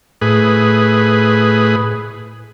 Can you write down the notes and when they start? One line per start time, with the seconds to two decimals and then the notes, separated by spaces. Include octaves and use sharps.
0.22 A2 G#4 B4